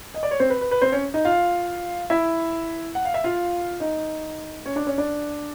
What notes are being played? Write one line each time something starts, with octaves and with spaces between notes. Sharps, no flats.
D#5
D5
C#5
C4 C5
B4
B4
B4
C4 C5
C#4 C#5
D#4 D#5
F4 F5
E4 E5
F#5
F5
E5
F4 F5
D#4 D#5
C#4 C#5
D4 D5
C#4 C#5
D4 D5